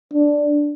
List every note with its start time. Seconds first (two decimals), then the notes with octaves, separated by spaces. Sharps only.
0.13 D4